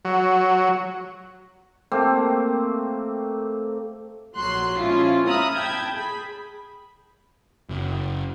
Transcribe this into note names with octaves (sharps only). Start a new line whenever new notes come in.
F#3
A3 A#3 C4 G4
A#1 F#3 C6 F#6 C7
F3 G#3 C#4 E4 F4
E5 A#5 B5 D#6 F6 F#6
G5 A5 B5 G6 G#6
G#4 B5
F#1